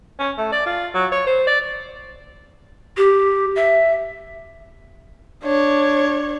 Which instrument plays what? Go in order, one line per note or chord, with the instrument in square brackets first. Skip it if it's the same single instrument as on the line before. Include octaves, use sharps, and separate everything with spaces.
[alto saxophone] C#4
A3
D5
F4
F#3
C#5
C5
D5
[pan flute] G4
E5
[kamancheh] D4 C#5